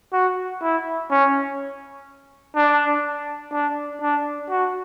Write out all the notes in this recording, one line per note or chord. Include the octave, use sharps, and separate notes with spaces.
F#4
E4
C#4
D4
D4
D4
F#4